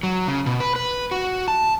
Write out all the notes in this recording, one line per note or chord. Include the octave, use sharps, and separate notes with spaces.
F#3
C#3
B2
B4
B4
F#4
A5